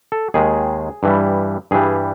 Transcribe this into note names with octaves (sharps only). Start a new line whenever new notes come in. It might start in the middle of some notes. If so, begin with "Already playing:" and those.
A4
D#2 D#3 G#3 G#4
G2 E3 G3
G2 E3 G3 G#4